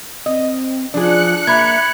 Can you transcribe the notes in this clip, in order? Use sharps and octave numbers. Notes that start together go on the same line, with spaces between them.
C4 D#5
F3 D4 G#4 F#6 C#7
A#3 E5 B5 G#6